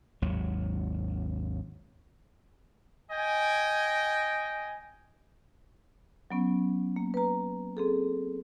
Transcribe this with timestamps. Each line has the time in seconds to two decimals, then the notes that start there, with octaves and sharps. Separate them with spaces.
0.22 G#1 D#2 F#3
3.11 D#5 G5 G#5
6.31 F#3 B3 C#4
6.96 A#3
7.14 B4 A#5
7.77 C4 G#4 A4